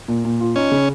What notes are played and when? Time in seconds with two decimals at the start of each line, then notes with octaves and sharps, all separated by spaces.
0.08 A#2
0.25 A#2
0.41 F4
0.56 C#4 D#4
0.72 C#3